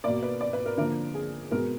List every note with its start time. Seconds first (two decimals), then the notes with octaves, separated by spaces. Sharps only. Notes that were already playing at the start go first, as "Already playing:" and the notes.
0.04 B2 A#3 D5
0.23 B4
0.41 D5
0.53 B4
0.66 A#4
0.77 D3 F3 A#3 A#4
1.14 G#4
1.51 B2 G#3 B3 A#4